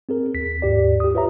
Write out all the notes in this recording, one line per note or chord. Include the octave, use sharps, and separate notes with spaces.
C4 G#4 A#4
D#2 B6
D#2 G#2 G4 D5
G4 D#6
F4 B4 C#5 E5 A#5